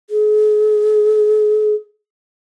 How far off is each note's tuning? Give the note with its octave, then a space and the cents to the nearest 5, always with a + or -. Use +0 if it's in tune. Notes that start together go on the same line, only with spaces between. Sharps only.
G#4 +40